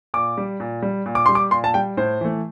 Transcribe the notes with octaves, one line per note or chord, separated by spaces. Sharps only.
A#2 D6
G3
A#2
G3
A#2
D6
G3 C6
D6
A#2 C6
A5
G3 G5
A2 C5
E3 A3